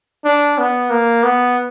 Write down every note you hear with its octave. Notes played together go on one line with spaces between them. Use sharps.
D4
B3
A#3
B3